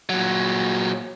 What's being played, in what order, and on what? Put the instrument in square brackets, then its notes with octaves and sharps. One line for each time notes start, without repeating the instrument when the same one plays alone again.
[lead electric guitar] A#2 F#3